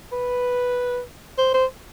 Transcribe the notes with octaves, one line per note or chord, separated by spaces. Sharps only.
B4
C5
C5